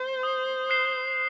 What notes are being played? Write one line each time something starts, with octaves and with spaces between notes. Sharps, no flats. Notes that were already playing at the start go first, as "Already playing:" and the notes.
Already playing: C5
D#6
F#6 C7 E7 G7